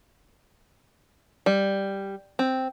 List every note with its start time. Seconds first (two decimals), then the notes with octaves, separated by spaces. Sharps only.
1.46 G3
2.39 C4